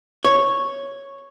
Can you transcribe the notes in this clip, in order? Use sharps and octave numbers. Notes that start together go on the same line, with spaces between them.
C#5